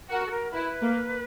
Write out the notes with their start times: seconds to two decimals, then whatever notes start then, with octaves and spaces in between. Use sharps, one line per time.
0.10 F#4 A#4
0.26 A4
0.31 A#4
0.52 E4 B4
0.81 A#3